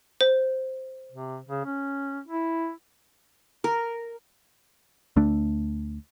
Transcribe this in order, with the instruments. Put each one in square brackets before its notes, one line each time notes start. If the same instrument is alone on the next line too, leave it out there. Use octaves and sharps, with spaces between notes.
[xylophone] C5
[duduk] C3
C#3
C#4
E4
[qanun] A#4
[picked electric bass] D2 A3 D4